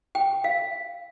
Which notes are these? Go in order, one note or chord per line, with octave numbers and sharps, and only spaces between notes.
G5
F5